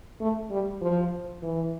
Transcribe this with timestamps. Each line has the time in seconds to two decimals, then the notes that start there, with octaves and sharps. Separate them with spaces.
0.21 A3
0.50 G3
0.81 F3
1.42 E3